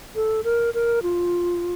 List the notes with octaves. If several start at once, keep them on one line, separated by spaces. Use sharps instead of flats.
A4
A#4
A#4
F4